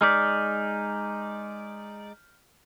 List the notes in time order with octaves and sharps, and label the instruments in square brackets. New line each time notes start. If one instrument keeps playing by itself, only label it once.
[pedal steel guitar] G#3 D#4 D5 [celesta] F6 G6 B6